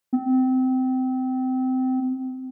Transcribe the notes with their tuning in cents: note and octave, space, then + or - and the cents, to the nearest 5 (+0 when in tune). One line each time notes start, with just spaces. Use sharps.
C4 -25